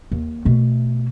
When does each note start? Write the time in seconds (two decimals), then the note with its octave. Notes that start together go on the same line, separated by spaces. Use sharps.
0.12 D#2
0.45 B2 A3